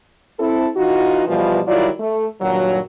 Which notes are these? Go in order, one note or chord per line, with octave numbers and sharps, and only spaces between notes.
C4 E4 A4
E3 D#4 F4 F#4
B2 E3 F3 G3 F4 B4
D#3 F#3 G3 E4 F4 D5
A3
G2 A#2 D#3 F#3